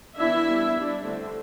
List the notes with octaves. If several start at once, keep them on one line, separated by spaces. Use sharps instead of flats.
E3 B3 D4 E4 E5
G3 B3 D4
G3 D4
D3 A3 C4